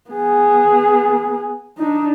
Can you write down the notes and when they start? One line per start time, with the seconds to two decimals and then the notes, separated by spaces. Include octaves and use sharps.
0.11 B3 G#4
1.78 D4 D#4